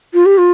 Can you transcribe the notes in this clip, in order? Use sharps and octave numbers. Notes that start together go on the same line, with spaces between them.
F4
G4
F4